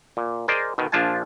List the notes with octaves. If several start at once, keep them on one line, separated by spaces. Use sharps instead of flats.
A#2
G#4 A#4 C5 D5 D#5
B2 D#3
A#1 F3 D4 F4 G#5 A5